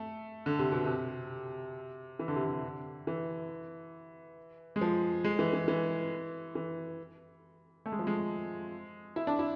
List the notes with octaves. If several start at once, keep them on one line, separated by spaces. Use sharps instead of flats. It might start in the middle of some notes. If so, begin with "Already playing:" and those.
Already playing: A3
D3
C3
B2
C3
E3
D3
C3
D3
E3
G#3
F3
G#3
E3
E3
E3
E3
A3
G#3
F3
G#3
E4
D4
E4